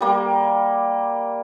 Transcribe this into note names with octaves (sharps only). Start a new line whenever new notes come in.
G3 A#3